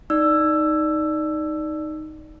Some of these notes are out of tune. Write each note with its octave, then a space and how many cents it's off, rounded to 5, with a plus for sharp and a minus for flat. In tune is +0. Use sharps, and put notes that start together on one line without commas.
D#4 +0 D5 +0 E6 +10